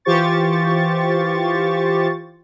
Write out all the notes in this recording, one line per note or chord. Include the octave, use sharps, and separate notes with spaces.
E3 F4 G4 C5 C#6 A6